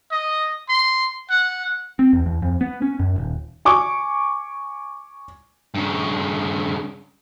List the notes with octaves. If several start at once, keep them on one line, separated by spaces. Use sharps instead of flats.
D#5
C6
F#5
C4
E2
E2
F2
B3
C#4
F#2
D#1
G#5 C#6 D6
G2 C#3